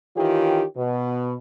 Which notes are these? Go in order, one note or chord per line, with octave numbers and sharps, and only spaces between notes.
D#3 E3 F4 G4 C#5
B2